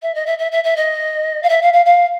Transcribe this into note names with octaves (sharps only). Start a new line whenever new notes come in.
E5
D#5
E5
E5
E5
E5
D#5
F5
E5
F5
F5
F5